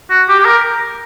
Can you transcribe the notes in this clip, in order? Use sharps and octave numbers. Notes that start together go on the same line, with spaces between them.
F#4
G4
G4
A#4